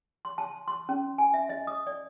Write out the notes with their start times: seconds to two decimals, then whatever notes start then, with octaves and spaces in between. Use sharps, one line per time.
0.25 C6
0.38 A5
0.68 C6
0.89 C#4
1.18 G#5
1.34 E5
1.49 D#5
1.67 D#6
1.87 D5